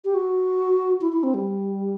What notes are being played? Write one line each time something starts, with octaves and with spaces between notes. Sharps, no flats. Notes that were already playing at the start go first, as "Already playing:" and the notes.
G4
F#4
E4
E4
C4
G3